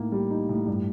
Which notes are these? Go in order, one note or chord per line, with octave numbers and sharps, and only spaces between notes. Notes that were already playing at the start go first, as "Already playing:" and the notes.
Already playing: A2 A#3 D#4
G3
D#4
A2
G2